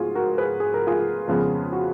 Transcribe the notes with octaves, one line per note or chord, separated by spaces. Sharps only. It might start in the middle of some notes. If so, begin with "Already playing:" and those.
Already playing: G#2 B3 F4 F#4 G#4
F#4 A#4
G#4 B4
G#4
A#4
F4 G#4
F2 C#3 G#3 B3
F#4